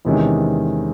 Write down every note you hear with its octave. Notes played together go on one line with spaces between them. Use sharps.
E2 C3 D#3 G#3 C#4